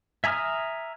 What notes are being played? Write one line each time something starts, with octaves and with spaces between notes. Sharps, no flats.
E5 G#5 A#5 D#6 F6